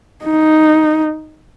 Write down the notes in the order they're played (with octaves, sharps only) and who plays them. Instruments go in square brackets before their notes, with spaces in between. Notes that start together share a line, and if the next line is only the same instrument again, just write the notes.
[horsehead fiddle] D#4